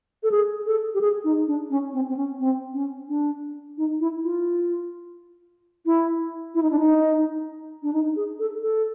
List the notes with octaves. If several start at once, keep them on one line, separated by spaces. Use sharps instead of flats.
A4
G#4
A4
G4
G#4
D#4
D4
C#4
C4
C4
C#4
C4
C#4
D4
D#4
E4
F4
E4
E4
D#4
D4
D#4
D4
D#4
G#4
A4
A4